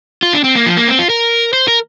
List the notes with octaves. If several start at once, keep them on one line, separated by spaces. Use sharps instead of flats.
F4
D4
C4
A#3
F3
A#3
C4
F4
A#4
C5
A#4